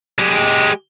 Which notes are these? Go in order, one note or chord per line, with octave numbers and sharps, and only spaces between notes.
G#3 G4